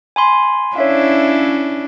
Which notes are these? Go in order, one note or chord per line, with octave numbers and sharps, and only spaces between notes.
G#5 B5 C6
C#4 D4 E4 C#5 E5 F5